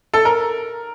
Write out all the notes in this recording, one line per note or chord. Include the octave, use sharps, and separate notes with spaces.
A4
A#4